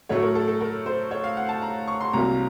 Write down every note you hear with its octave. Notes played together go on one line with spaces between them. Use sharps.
A2 F#3 A3 C#5
A#4
A4
A4
A#4
C5
C#5
F5
F#5
A5
A#5
C#6
C6
C2 C3 F#3 A#3 A#5